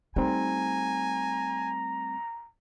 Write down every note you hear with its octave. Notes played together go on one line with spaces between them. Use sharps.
G3 A3 C4 D#4 G#5 A#5